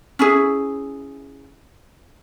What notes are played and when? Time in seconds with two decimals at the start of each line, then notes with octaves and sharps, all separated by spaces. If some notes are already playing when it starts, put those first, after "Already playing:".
0.19 C#4 E4 G#4